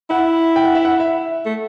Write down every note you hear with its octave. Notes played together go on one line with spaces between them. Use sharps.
E4 F#5
G5
F#5
E5
F#5
E5
A3